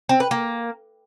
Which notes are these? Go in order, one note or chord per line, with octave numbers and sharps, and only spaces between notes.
C4
B4
A#3